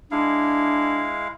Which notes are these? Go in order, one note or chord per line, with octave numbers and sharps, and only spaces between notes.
G#3 D4 E4 F5